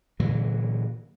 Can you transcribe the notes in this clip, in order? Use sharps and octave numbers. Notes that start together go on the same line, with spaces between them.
A#2 D3 E3 F#3